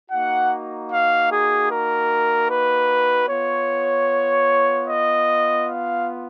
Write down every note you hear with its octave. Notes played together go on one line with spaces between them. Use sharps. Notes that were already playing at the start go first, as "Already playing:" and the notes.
A#3 D#4 F#4 F#5
F5
G#4
A#4
B4
B3 F4 C#5
D#5
F5